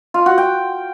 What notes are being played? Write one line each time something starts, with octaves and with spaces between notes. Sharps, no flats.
F4
F#4
G5